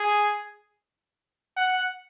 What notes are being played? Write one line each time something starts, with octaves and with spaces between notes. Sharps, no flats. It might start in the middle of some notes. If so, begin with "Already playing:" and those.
Already playing: G#4
F#5